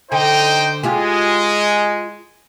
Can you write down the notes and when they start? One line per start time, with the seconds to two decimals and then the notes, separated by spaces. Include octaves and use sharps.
0.12 D3 D#4 C5 G5
0.83 G#3 F4 G4 G#4